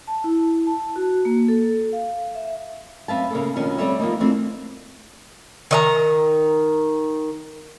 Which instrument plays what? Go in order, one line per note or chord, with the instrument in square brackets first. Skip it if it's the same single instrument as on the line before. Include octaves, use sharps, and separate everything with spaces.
[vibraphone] A5
E4
A5
F#4
A#3
A4
F5
E5
[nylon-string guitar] F#2 C4 B4 E5 F5 A5
C#3 A#3 A4
F2 B2 D#3 C#4 D4
G3 C4 A4 C#5 E5
F3 G3 A#3 D#4
E3 F3 A3 C4 D4
[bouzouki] D#3 D#5 A#5